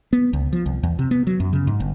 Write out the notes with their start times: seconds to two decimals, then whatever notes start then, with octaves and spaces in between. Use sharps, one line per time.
0.13 B3
0.33 C#2
0.53 F3
0.66 C2
0.83 E2
0.99 C3
1.11 B3
1.27 F#3
1.40 F#2
1.53 C#3
1.67 G#2
1.80 G1